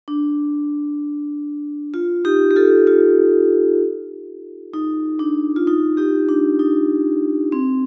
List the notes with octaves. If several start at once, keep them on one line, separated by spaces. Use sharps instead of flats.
D4
F4
D#4 G4
G4
F4 A4
F4
D#4
D4
F4
D#4
D#4 G4
D4
D#4
C4